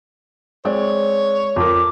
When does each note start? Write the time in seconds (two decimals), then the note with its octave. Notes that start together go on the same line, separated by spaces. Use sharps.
0.65 G#3 C4 C#5 D5
1.56 F2 A#4 D6